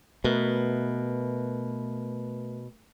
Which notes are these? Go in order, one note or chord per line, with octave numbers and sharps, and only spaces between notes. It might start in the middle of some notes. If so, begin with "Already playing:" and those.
B2 A3 A#4 B4